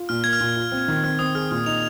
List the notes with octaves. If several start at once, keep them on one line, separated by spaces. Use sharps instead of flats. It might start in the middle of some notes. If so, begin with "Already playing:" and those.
Already playing: F4
A#2 F6
A#3 G#6
F6
A#2
F4
C4
D#3
C4 F6
C4 D#6
G#4 F6
A#2 F6
D#4 F7